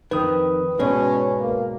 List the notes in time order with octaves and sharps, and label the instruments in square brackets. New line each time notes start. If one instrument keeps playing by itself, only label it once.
[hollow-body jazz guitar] F2 D#3 [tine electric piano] B4 D#6
[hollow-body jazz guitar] G#2 B2 G#3 [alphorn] C#4 [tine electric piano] B4 D5
[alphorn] A#3